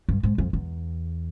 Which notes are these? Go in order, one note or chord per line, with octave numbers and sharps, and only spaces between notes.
G2
G#2
F2
E2